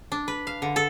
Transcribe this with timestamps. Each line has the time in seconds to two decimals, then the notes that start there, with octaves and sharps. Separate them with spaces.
0.12 D4
0.28 B4
0.47 F5
0.62 D3
0.76 A4